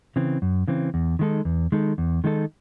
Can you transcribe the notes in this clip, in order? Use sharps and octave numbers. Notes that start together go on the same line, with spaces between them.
C#3 E3 C4
F#2
C#3 E3 C4
E2
D#3 G#3 D#4 A4
E2
D#3 G#3 D#4 A4
E2
D#3 G#3 D#4 A4